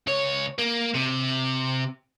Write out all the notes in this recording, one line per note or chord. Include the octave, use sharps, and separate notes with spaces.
C#2 C#5
A#3
C3